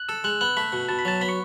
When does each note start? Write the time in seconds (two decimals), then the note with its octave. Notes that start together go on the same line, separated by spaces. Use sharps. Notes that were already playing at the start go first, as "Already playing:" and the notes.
Already playing: F#6
0.09 A4 E6
0.24 G#3 F#6
0.41 B3 F#6
0.57 A3 B5
0.72 B2
0.89 B2 A5
0.99 B5
1.05 F#3 A5
1.21 B3 B5
1.29 C#6